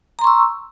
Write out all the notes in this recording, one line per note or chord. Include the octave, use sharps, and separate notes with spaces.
A#5 C6 C#6 E6